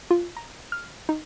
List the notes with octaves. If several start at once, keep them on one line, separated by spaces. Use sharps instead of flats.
F4
A#5
F6
D#4